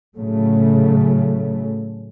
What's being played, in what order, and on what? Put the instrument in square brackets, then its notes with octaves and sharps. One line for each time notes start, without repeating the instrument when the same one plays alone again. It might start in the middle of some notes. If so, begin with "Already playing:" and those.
[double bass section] A2 C#3 F#3 A3